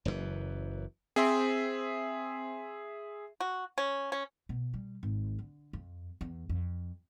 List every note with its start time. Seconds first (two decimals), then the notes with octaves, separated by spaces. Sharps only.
0.05 F#1 F#2 A2 E3
1.16 C4 G#4 E5 C6
3.40 F#4
3.78 C#4
4.12 C#4
4.49 B2
4.74 G3
5.03 G#1
5.39 D3
5.73 F2
6.21 E2
6.49 F2